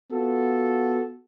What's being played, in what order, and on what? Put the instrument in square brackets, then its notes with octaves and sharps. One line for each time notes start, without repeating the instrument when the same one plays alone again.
[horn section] B3 F4 F#4 A4